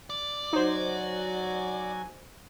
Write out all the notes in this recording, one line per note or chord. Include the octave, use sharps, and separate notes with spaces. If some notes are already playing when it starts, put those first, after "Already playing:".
D5
F#3 D#4 F#4 C5 G#5